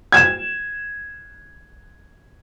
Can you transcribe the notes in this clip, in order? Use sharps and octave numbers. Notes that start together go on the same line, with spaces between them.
G#6 E7